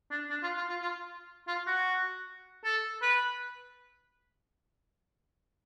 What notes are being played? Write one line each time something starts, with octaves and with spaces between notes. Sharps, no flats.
D4
D4
F4
F4
F4
F4
F4
F#4
A4
B4